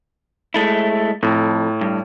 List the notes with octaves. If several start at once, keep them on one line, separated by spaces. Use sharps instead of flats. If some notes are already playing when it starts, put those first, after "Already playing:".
G#3 A3 E4
F2 A2
G2